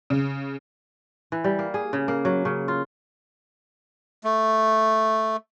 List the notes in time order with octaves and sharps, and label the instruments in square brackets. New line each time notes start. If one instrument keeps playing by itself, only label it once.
[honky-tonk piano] C#3
[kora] E3
G3
A#3
G#4
C#3
A#3
F#3
C#3
F4
[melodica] A3